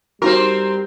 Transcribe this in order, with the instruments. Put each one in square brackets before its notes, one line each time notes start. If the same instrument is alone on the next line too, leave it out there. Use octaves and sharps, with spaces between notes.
[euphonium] G3 [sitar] C4 A#4 [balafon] D#4 F#4